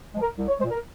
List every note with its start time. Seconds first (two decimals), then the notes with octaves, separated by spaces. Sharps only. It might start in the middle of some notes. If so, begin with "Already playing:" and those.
0.14 F3 G#3
0.21 A#4
0.38 C2
0.48 C#5
0.59 G#3 C5
0.64 A#2
0.71 A#4